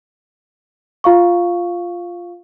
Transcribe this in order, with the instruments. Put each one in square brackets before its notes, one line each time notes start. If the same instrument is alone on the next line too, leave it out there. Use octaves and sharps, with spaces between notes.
[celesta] F4 F5 C#6